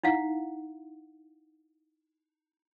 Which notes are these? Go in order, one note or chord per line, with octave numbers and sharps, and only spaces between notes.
D#4 E4 F5 F#5